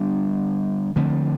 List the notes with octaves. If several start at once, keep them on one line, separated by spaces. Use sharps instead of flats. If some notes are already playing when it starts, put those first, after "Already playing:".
Already playing: D3 G3 B3 D4
D3 F3 A3 C4